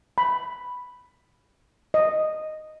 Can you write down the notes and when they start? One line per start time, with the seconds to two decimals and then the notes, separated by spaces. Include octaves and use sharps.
0.18 B5
1.94 D#5